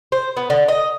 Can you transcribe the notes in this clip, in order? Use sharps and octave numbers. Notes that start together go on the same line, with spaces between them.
C5
B3
D3
D#5